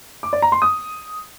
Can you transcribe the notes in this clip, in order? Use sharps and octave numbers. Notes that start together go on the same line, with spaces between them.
D6
D5
A#5
C6
D#6